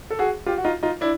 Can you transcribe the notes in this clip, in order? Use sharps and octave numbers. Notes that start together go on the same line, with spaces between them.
A4
F#4 G#4
F4 G4
F#4
D#4 F4
D#4 F4
D4 E4